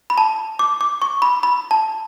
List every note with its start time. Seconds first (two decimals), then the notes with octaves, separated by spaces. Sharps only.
0.10 B5
0.18 A5
0.59 D6
0.81 D6
1.02 C#6
1.22 B5
1.43 B5
1.71 A5